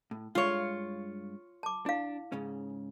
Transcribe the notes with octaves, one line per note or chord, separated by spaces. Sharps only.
A2
G2 G#3 F4 C#5 F5
A5 D6
D4 E4 F5
G#2 C#3 C#4